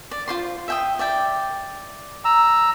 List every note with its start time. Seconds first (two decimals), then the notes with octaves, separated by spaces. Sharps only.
0.11 D5
0.28 F4 C5 C6
0.68 E5 G5 D#6
0.99 D5 E5 G5
2.25 A#5 E6